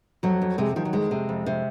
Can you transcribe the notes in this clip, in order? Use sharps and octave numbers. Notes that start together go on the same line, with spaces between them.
F2 F#3
F2
C3 G#3
D#3 F3
F#3
F2 G#3
C3
F2
C3